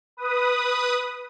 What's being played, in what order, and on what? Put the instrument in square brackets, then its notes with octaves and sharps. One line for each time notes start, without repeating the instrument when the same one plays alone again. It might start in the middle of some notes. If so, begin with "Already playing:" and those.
[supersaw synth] B4 D#6